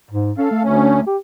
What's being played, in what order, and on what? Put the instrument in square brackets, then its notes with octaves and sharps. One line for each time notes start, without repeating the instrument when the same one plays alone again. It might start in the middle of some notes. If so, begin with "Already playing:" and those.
[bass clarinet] G#2
[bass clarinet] C#4 [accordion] A4 F5
[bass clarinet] A3
[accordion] D2 C#4
[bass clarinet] G4